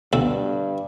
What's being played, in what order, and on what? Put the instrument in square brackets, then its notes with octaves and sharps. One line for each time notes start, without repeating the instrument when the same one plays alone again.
[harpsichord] D2 B2 A4 [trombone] G2